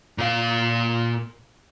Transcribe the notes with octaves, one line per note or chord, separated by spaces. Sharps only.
A#2 F5